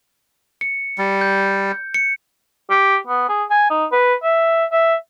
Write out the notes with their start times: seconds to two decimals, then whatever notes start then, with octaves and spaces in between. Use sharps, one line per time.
0.61 C#7
0.98 G3
1.21 G6
1.94 C#7
2.70 G4
3.07 B3
3.29 G#4
3.50 G#5
3.70 D#4
3.92 B4
4.23 E5
4.72 E5